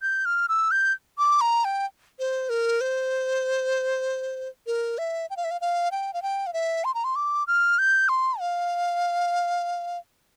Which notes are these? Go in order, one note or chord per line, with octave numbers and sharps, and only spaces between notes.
G6
F6
E6
G6
D6
A#5
G5
C5
A#4
C5
A#4
E5
G5
F5
E5
F5
F5
G5
F5
G5
F5
E5
C6
A#5
C6
D6
F6
G6
C6
F5